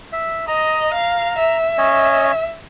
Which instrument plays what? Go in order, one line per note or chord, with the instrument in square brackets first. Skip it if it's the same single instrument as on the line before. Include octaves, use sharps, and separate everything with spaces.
[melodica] E5
[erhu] D#5 [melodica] A#5
[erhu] F5
E5
[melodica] C#4 C#5 D#5